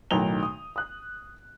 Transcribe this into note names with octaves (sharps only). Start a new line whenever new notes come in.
B1 A2 D#3 A#5 F7 G7
D#6
D#6 F#6